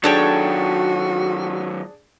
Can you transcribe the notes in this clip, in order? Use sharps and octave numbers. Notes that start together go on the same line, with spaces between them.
D#3 F#3 D4 F#4 G#4 A4 C#5 G5